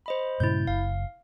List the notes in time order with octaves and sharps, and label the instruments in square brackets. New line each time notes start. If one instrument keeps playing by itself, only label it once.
[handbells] C5 D#5 B5
[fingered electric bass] G2 A#2 C#3 [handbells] E4 G6
[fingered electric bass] F#1 [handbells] F5